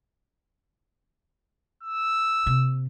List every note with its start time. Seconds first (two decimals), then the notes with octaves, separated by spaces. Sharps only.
1.83 E6
2.46 C3 A#3